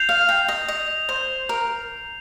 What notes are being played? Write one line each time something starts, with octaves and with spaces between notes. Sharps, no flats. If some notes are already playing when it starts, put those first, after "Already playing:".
Already playing: G6 C7 F7
F5
G5
D#5
D#5
C5
A#4